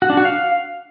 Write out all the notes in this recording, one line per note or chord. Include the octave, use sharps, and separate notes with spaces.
F#4
D4
F#4
F5